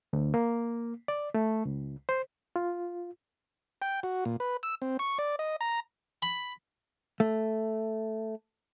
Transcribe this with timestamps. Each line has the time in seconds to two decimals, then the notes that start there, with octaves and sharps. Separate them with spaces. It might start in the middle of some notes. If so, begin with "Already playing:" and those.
0.13 D2
0.34 A#3
1.08 D5
1.34 A3
1.65 C#2
2.09 C5
2.56 F4
3.82 G5
4.03 F#4
4.25 A#2
4.40 B4
4.63 E6
4.82 C4
4.99 C#6
5.18 D5
5.39 D#5
5.61 A#5
6.22 B5
7.20 A3